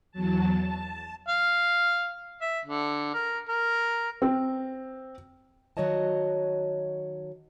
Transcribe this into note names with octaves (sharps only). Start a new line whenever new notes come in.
E2 F#3 A5
A5
F5
E5
D3
A#4
A#4
C4
D#3 F#3 F#4 C#5 D#5 A5